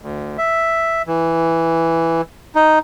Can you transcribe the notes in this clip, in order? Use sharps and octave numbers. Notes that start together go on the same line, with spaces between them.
D2
E5
E3
D#4